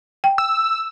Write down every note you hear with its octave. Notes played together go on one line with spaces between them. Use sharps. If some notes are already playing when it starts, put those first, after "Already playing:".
G5
E6